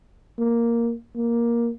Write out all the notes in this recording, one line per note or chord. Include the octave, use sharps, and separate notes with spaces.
A#3
A#3